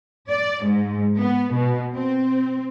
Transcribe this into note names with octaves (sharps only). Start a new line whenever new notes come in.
D5
G#2
B3
B2
C4